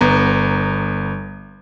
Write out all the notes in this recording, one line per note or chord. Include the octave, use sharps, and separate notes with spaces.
G1 B3 A#5